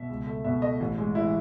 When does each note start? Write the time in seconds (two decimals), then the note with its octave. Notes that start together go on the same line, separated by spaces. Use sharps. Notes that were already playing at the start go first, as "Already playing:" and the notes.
Already playing: B2 E5
0.09 C#2
0.27 A3
0.45 B2 E5
0.62 A3 D#5
0.80 A1
0.98 G#3
1.15 E3 E4